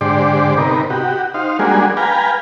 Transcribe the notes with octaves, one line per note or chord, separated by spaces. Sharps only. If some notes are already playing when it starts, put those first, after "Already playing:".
G#2 D3 G4 C5 D5
C3 B3 D#4 A#4
F#4 G4
D#4 C5 F5
G3 G#3 A#3 D4 F#4 G#4
B4 F5 G5 G#5 A#5